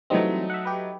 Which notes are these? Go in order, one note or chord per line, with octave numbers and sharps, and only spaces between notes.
E3 F#3 G3 A3 C4 D#4
E5 F#5
G4 B4